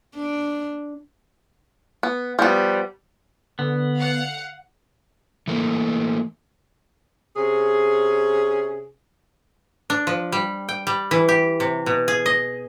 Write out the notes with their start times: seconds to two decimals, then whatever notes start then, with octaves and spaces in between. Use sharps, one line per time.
0.15 D4
2.03 B3
2.39 F3 G3 B3
3.59 D3 B3
3.97 F5 F#5
5.48 E3 A3 A#3
7.36 C3 C#4 G#4
9.90 D4
10.07 F3
10.32 G3
10.69 G5
10.87 G3
11.11 E3
11.29 G4
11.60 C3
11.86 B2
12.08 G#4
12.26 D#5